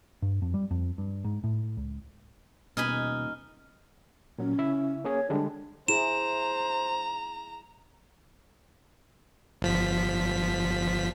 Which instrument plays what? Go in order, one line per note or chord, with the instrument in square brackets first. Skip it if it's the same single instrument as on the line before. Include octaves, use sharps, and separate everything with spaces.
[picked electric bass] G2
F2
G3
F2
G2
G#2
A2
C#2
[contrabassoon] D#1 [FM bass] B2 [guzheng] D#4 G#5 B5 [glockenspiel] F6
[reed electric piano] A#2 F#3 [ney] C#4
[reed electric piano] C#3 E4 E5
[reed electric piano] A#3 C#4 G#4 [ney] C#5
[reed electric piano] D3 G3 G#3 [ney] D4
[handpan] E4 G#4 [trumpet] C5 [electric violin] A#5 [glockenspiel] E7
[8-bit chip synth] G1 F3 B6